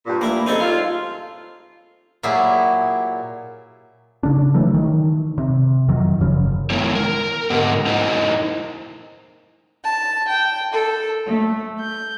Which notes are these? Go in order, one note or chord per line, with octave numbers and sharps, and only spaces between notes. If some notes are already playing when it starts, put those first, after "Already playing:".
G2 A#2
A#3 E4
C#3 G3 C4 D#4 G#4 A4
F4
A#2 F#3 E4 G4 G#4
C#3 D4
E3 F#3 A3
D#3
C3
F2 D#3 F#3
F#1 F#2 C#3 F3
D#3 G#3 B3 E4 A#4 C#5
A#4
G#2 D3 B3 G4 D#5 F#5
D#4 E4 A#4 C5 D#5
A5
G5
A4
A3
G6